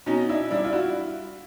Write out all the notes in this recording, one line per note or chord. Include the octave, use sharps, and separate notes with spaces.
B2 C#4 D#4
D4 E4
G3 D4 E4
F4
E4 F#4